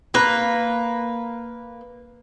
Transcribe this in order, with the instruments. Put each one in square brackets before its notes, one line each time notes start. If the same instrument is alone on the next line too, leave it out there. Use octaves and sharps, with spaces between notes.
[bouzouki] A#3 B4